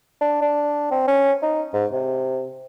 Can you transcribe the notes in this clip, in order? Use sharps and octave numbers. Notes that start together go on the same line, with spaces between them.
D4
D4
C4
C#4
D#4
G#2
C3